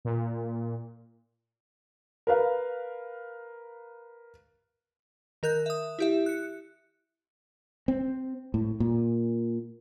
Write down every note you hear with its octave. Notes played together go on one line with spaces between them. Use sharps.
A#2
A#4 B4 F5
D#3 A#4 F#6 G6
E5 D#6
E4 G4 E5
F#6 C#7
C4
A2
A#2